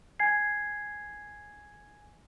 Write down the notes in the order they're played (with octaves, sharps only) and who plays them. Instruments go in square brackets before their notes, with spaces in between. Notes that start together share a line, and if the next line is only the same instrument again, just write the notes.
[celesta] G#5 G#6 C7